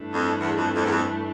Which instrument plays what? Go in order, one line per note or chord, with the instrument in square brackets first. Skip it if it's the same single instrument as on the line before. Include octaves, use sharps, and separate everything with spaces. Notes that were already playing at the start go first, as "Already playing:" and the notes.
Already playing: [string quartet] G2 E3 A3 D4
[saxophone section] F2
E2
F2
F2
E2
F2